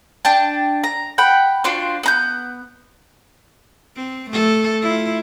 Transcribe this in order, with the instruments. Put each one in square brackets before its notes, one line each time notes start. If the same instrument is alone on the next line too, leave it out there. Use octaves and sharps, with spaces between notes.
[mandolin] D4 G5 A5
A#5
F#5 G5 B5
D4 F4 F#4 C5
B3 A#5 G6
[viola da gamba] C4
A3 A4
E4 F4